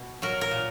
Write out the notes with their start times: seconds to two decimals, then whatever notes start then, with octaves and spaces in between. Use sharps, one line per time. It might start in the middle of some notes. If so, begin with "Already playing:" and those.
Already playing: B2
0.22 F#3 A#4
0.41 A#4
0.51 A#2